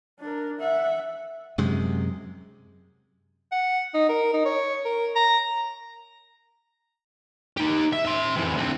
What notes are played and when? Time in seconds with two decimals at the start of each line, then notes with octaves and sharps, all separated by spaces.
0.20 D4 A#4
0.59 E5 F#5
1.58 F#2 C3 G#3
3.52 F#5
3.94 D#4
4.09 A#4
4.33 D#4
4.45 C#5
4.86 A#4
5.16 A#5
7.57 D#4 G4
7.93 E5
8.06 E5 C6
8.36 F2 E3
8.54 D2 C4